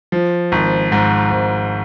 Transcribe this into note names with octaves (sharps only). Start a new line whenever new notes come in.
F3
G#1
G#2
G#1